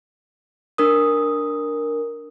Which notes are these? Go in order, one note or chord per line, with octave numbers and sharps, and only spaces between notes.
D4 A#4 D#6